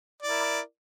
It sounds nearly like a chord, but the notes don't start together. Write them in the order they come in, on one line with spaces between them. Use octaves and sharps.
D5 E4 A#4